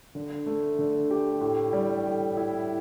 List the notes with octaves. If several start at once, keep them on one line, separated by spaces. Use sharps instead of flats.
D3
A3
D3
G4
A2
G3
A2
E4